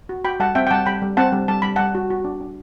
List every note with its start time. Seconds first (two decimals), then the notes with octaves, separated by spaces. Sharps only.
0.09 F#4
0.24 F#4 G5 B5
0.40 G3 F#5 A5
0.55 C4 E5 G5
0.67 G5
0.71 G3 F#5 A5
0.86 G3 G5 B5
1.02 G3
1.17 C4 F#5 A5
1.32 G3
1.48 G3 A5
1.62 G3 B5
1.76 G3 F#5 A5
1.95 F#4
2.10 F#4
2.25 D4
2.41 D4